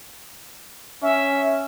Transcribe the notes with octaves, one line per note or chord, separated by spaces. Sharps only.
C#4 E5